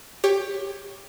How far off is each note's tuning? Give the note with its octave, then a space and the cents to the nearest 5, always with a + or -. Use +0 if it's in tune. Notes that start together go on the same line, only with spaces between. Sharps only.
G4 +15 C#5 +0